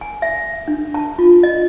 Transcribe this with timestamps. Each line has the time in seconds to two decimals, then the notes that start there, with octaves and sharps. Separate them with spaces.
0.01 G#5
0.22 E5
0.68 D4
0.94 A5
1.18 F4
1.43 D#5